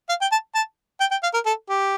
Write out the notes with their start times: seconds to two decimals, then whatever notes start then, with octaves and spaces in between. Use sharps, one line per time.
0.09 F5
0.21 G5
0.32 A5
0.55 A5
1.00 G5
1.11 G5
1.23 F5
1.34 A#4
1.46 A4
1.69 G4